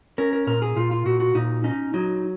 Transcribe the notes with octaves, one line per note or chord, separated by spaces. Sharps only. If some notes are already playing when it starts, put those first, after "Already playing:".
C#4 A#4
A#4
A#2 A#4
G#4
A#2 F4
F4
A#2 F#4
F#4
A#2 D#4
C#4 D#4
F#3 D#4